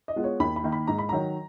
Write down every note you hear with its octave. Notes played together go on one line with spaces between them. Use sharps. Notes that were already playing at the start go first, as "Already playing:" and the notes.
D#5
G#3 B3 F4
C#5
D#2 B5
B5
D#3 A#3
B5
G#2 A#5
B5
D#3 F#3 A#5